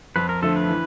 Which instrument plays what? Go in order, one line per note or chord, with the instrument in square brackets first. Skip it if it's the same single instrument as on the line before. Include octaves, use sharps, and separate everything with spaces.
[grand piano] F2 [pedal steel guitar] B4
[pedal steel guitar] A#4
[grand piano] D3 F3 A3 [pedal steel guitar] A4
[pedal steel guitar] B4
[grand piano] E3